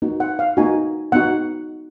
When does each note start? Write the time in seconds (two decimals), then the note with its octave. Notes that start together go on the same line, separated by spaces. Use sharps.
0.02 A#3 D#4 F#4
0.20 F#5
0.39 F5
0.57 A#3 D#4 F#4 G#5
1.12 B3 D#4 F#4 F#5